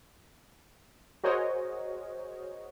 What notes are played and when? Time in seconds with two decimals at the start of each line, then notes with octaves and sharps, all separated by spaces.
1.24 F#4 G#4 A#4 C5 C#5 D#5